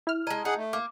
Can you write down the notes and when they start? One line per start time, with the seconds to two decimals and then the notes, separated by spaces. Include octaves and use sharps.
0.07 E4 F6
0.27 G#3 D#5 A5 A#5 G#6
0.45 D#4 G#4 F#5
0.57 A3
0.73 A#3 D6